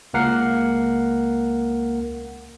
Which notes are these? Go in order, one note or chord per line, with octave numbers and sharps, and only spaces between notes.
C#2 A#3 A#4 F#5 C7